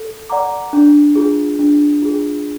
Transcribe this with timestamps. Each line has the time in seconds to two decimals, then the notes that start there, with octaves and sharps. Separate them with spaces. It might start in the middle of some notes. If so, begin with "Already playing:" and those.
Already playing: A4
0.30 D5 F#5 A#5 D6
0.73 D4
1.15 F4 G#4
1.59 D4
2.02 F4 G#4